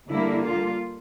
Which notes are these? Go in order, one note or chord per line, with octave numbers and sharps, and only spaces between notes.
D3 G3 A#3 E4
F4